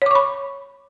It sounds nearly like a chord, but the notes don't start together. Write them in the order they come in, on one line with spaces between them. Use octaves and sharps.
C#5 D6 C#6 B5